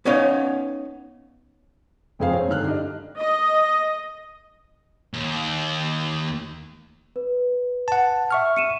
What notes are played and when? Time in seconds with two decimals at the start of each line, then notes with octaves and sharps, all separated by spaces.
0.05 B3 C#4 D#4 C#5 F5
2.19 F1 F2 F3 G#4 C5 F5
2.33 C4 C#5
2.48 G2 D3 D#3 F6 F#6
2.64 D4 D#4 G4 D#5
3.17 D#5
5.13 D#2
7.16 B4
7.88 F#5 A5
8.31 E5 C#6 F6
8.56 C#7 D#7 E7